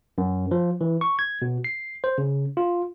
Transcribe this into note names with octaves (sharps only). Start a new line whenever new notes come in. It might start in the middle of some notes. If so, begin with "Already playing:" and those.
F#2
F3
E3
C#6
G#6
B2
C7
C5
C#3
F4